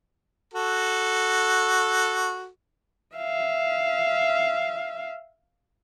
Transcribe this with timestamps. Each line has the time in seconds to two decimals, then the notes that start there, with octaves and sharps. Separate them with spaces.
0.54 F#4 A4
3.15 E5 F5